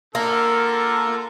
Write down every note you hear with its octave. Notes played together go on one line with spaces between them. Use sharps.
D3 A#3 F4 A4 A#4